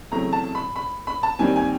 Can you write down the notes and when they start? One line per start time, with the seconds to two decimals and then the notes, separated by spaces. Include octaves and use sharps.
0.12 E2 C#3 F#3 A3 C4 A#5
0.33 A5
0.55 B5
0.76 B5
1.07 B5
1.23 A5
1.39 D#2 D#3 G3 C4 G#5
1.56 G#5